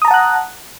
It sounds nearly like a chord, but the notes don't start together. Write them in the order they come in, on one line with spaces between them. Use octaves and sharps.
D#6 A#5 A5 F#5 F#6